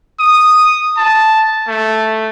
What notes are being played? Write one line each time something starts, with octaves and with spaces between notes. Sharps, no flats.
D#6
A5
A3